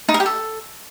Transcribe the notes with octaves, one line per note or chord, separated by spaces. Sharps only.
D#4
A#4
G4
A4